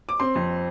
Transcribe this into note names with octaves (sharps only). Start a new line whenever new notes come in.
D6
C4 C6
F2